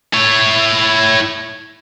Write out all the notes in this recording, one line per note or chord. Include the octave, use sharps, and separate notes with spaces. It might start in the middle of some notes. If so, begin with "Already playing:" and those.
E4 C#5